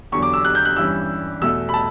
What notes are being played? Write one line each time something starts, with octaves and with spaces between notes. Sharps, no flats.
E2 D3 F#3 C#6
D6
E6
F#6
G6
F#6
G2 E3 G3 C#4 E6
E2 B2 A3 E6
B5
A5